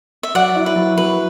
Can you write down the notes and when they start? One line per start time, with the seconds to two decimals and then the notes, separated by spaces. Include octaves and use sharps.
0.23 E5
0.35 F#3 D5 F#5
0.55 E4
0.66 B4
0.76 F#3
0.97 F#3 B4